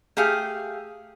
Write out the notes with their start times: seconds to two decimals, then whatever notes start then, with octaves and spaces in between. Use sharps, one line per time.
0.17 A3 G4 G#4 F5